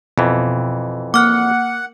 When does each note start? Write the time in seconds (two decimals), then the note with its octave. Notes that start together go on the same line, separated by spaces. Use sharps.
0.18 F2 B2 E3
1.14 A#3 F#5 D6 F6 F#6